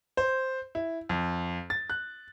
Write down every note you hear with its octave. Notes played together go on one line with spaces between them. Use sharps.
C5
E4
F2
A6
F#6